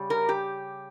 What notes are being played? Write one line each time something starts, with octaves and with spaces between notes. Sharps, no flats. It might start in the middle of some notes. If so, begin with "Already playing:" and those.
Already playing: C#3 G3
A#4
G4